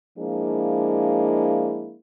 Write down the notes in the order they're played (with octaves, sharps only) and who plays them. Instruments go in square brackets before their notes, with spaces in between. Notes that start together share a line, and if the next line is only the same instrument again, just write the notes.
[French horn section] F3 G#3 A#3 D4 E4